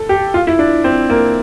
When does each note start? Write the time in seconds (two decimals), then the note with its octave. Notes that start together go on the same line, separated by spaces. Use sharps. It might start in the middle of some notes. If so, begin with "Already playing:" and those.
Already playing: A4
0.09 G4
0.34 F4
0.47 E4
0.59 D4
0.84 C4
1.10 A#3